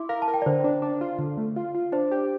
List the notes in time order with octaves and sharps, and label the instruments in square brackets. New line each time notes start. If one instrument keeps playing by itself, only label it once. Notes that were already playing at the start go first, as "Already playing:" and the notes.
Already playing: [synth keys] E4 [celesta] C6 D6
[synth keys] A#4 [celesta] F5
[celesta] A5
[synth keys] A#4
[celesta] G5
D5
[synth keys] D3 [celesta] C5
[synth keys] D4
D4
F4
D3
A3
F4
F4
[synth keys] D4 [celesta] C5
[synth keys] G4